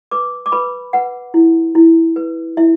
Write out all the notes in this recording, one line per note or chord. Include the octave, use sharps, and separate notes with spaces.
B4 D6
D6
B4 B5
B4 F#5
E4
E4
B4
E4 E5